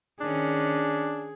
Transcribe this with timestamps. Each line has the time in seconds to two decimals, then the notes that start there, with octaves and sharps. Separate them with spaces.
0.21 D#3 C#4 D4 G#4